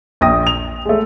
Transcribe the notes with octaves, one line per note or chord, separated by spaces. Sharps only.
A#1 G5 D#6 A#6
F7
G#3 A3